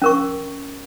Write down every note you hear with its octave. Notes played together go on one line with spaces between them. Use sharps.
C#4 A#4 C#6